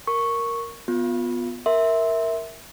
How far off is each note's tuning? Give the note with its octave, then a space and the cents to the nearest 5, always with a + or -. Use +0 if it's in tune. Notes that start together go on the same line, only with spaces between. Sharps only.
A#4 +0 C#6 -5
B3 +0 F4 +15
A#4 +0 E5 -10 C6 +0